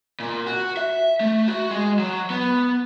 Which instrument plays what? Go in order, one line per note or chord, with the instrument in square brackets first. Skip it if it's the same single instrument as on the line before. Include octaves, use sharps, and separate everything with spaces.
[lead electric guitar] A#2
F#4
E5
A3
F#4
G#3
F#3
B3